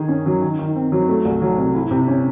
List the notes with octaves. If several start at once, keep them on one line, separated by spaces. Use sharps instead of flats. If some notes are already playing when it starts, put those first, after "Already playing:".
Already playing: D#3 G#4
C#4
F#3
D#3
D#3
C4
F#3
A3
C2
F#3
C3
E4
C3
C#4